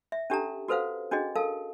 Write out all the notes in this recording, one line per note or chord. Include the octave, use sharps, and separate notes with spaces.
E5
C#4 D4 G4 A4 A5 A#5
F#4 A4 B4 C5 F5 F#5
C#4 D4 F#4 G#4 D#5
A4 A#4 F5 A5